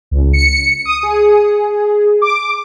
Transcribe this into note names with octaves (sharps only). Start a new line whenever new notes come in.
C#2
C#7
D#6
G#4
D6